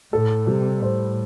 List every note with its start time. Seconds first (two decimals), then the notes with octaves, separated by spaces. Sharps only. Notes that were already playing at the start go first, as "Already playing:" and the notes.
0.13 A2 A4
0.47 C3 G3
0.81 A2 C5